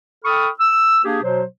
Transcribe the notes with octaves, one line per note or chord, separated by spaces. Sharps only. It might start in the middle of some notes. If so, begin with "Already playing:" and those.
A4 G5 B5 C#6 D#6 F6
E6
A#3 D4 G4 G#4
B2 F#3 C5